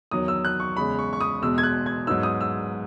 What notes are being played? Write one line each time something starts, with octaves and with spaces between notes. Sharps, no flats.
E2 D#3 F#3 D#6
E6
F#6
C#6
E2 C#3 G#3 B5
C#6
C#6
D#6
E2 B2 G#3 E6
G#6
F#6
G#6
G#2 F#3 B3 D#4 E6
D#6
E6